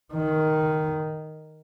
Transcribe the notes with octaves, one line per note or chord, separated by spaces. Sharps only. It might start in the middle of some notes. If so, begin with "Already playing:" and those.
D#3